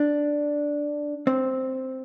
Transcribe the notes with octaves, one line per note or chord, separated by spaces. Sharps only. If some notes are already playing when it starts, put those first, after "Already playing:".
Already playing: D4
C4